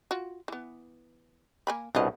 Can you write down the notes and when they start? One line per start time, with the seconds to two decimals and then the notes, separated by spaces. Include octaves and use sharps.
0.11 F4 F#4
0.48 E3 B3
1.67 A#3 G#5 B5
1.95 C2 B2 D4 F4 D#5